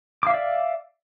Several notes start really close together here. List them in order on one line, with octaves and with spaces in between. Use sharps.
D6 F5 E5 D5